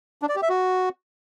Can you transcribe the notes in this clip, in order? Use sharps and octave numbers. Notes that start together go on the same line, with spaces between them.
D4
D5
G4
E5
F#4